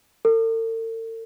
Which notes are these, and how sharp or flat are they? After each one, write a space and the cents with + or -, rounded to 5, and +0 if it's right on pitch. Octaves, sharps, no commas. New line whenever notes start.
A4 +45